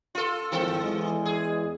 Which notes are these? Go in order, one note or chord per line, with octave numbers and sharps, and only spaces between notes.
F4 A4
G#1 E3 C4 A4
E2 G#3
G#4